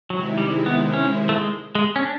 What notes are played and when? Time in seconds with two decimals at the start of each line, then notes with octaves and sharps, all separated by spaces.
0.10 C3 D#3 F#3 G#3 C4 E4
0.38 G3
0.66 B3
0.94 C#4
1.29 A3
1.35 G#3
1.75 G#3
1.96 C#4
2.02 D4